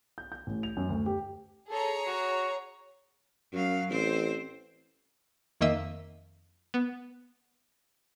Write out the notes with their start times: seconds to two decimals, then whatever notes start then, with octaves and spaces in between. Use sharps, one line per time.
0.18 G6
0.32 G6
0.47 A1
0.63 F7
0.77 F#2
0.89 D2
1.06 G4
1.70 G#4 A4 C#5 A#5
2.06 F#4
3.53 F#2 F#3 F5
3.90 A1 C4 C5
5.61 F2 D#3 A#3 D#5 E5 E6
6.74 B3